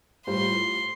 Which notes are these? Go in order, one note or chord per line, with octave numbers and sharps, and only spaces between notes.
A2 G3 F4 C5 C6